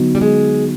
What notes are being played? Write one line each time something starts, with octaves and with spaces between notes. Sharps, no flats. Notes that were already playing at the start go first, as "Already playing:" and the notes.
Already playing: D3 F#3 B3 D#4 F#4
G3
G#3